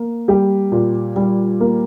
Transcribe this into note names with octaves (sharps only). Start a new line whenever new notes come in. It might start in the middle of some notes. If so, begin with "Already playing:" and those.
Already playing: A#3
G3 G4
A#2
G3
A#3